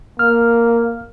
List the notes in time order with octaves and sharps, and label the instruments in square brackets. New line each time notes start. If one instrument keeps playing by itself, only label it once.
[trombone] A#3 [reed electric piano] F6